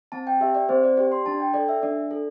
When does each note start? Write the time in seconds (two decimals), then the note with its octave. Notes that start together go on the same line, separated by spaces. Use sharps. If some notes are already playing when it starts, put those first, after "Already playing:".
0.12 C4 A5
0.27 G5
0.41 G4 E5
0.55 D5
0.69 C4 C5
0.84 D5
0.97 G4 D5
1.12 C6
1.26 D4 A5
1.40 G5
1.54 A4 D5
1.69 E5
1.82 D4 D5
2.11 A4